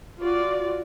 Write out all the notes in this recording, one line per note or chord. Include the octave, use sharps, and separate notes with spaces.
F4 F#4 D5